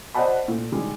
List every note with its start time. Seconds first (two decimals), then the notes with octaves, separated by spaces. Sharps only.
0.14 C5 D5 D#5 F#5 A5 B5
0.48 A#2 A3
0.72 D#3 G3 G#3